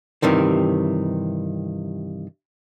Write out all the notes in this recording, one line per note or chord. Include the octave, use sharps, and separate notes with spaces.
G2 C3 D#3 E3